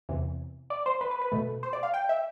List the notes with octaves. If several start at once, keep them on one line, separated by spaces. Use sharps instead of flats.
E2 C3 E3
D5
C5
B4
B4
B4
B2 A3
C5
D5
F5
G5
E5